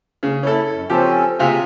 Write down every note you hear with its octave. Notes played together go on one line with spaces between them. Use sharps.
C#3
C#4 E4 A4
F#2
F3 C4 C#4 G4 A4
C3 F4 G#4 E5